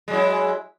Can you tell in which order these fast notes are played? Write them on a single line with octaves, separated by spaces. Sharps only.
G#3 F#3 E4